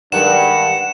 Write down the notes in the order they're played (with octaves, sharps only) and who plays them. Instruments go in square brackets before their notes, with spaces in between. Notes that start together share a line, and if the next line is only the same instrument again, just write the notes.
[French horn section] G2 [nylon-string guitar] D#3 G3 G#3 [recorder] F#5 [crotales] E7